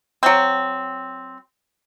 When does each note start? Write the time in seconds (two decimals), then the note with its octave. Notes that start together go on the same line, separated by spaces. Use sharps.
0.23 F#3 C4